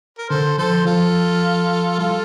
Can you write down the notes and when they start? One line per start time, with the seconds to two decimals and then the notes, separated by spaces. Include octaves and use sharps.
0.18 A#4
0.30 D3 A4 C5
0.58 F3 A4 C5
0.86 F3 F4 A4
1.98 G3 F4 A4